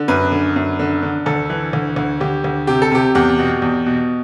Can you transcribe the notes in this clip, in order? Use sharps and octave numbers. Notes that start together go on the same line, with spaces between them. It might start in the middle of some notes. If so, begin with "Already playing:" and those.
Already playing: D3
F#2 B4
D3
F#2
D3
D3
D2 A4
E3
D2
D2
D2 G4
D2
C3 G4
A4
C3 G4
E2 G4
B2
E2
B2